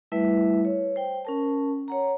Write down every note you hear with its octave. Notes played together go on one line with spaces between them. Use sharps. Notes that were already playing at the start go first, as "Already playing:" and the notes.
G3 A3 E4 B4 E5
C#5
C5 G5
C#4 A#4 A5
C#5 F#5 A#5